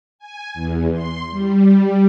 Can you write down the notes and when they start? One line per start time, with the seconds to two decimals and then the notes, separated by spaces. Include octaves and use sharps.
0.19 G#5
0.54 E2
0.92 C6
1.31 G3